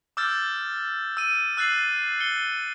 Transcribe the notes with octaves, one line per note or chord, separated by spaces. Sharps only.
D6 E6 F6 G6 A6
E6 D#7
E6 F#6 A6 C7 F#7
C#7 G7